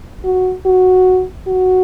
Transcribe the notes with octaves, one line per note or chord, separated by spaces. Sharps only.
F#4
F#4
F#4